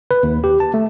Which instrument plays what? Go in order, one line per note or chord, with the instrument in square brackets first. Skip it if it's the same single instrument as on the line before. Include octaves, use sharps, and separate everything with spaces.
[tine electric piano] B4
D#2
G4
A5
A3